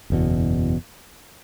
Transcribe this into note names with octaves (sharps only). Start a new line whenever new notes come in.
F#1 E2 B2